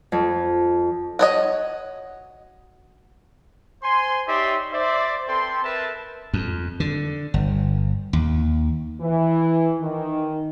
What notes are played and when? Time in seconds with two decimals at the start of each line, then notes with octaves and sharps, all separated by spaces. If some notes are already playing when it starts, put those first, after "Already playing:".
0.12 F2
1.19 F#4 C#5 D#5
3.83 C5 G#5 C6
4.27 D#4 G4 C#5 D5 E5 C6
4.72 C5 D5 E5
5.28 C4 A4 B4 G5 C6
5.63 A#4 B4 E5 A5
6.33 F2
6.80 D3
7.34 G1
8.13 D#2
9.01 E3
9.81 D#3